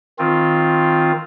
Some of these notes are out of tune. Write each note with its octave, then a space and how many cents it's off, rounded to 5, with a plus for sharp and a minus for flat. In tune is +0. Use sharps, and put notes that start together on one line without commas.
D#3 +15 C4 +0 F4 +0